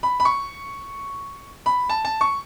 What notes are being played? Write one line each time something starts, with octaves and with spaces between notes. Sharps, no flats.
B5
B5
C#6
B5
A5
A5
C#6